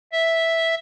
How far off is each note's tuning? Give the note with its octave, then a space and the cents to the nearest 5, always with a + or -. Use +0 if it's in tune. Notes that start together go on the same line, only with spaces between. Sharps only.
E5 -5